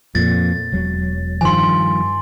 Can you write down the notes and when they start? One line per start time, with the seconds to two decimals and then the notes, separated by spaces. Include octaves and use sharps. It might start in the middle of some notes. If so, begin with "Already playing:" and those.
0.15 F2 A#2 A6
0.72 E1 F#3
1.41 G2 D#3 F3 G#5 C6